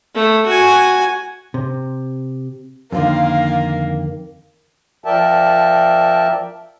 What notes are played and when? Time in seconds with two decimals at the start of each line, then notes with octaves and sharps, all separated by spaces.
0.15 A3
0.46 F#4 G#5
1.54 C3
2.92 F2 D3 D#3 A#3 F5
5.04 F3 A#4 D5 E5 G5 A5